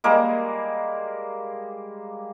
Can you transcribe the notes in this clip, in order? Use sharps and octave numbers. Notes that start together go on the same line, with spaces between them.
G3 G#3 A#3 A#4